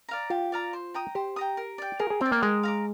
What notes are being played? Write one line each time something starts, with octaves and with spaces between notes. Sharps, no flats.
D5 F5 A#5
F4 G4
D5 F5 A#5
C5
G5 A#5 D#6
G4 C5
G5 A#5 D#6
A#4
D5 G5
G#4 A#4
G#4
C4 D5 G5
A#3
G#3 A#4
F5 A#5 D6